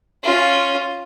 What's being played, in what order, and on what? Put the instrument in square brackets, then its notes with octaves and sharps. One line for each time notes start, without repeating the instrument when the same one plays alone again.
[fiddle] C#4 F4